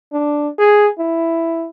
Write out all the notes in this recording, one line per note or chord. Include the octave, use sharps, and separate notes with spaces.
D4
G#4
E4